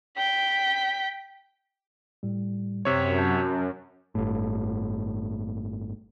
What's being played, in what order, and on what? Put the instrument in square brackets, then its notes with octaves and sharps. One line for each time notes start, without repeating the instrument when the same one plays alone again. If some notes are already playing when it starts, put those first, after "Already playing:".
[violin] G5 B6
[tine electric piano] A2 G3
[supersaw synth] F#2 [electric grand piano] C3 C#5
[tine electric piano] A5 G6
[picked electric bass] G1 A2